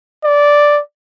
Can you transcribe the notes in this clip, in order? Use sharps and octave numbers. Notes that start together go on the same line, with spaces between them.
D5